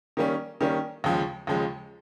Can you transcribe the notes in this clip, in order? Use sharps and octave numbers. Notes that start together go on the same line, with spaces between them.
D#3 G3 A#3 C#4
D#3 G3 A#3 C#4
D#2 C#3 F3 G#3
D#2 C#3 F3 G#3